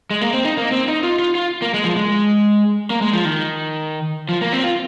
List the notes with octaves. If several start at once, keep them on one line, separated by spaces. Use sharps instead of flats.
G#3
A#3
C4
D#4
A#3
C4
D#4
F4
F4
F4
A#3
G#3
F3
G#3
A#3
G#3
F3
D#3
F3
A#3
C4
F4